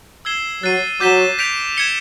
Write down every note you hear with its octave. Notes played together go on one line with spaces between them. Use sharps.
E6 G#6 C7 E7 G7
F#3 F#6 A6 C7 D#7
F#3 D6 G6 B6 E7 G7
G6 B6 D7 F7
G#6 C#7 E7 G7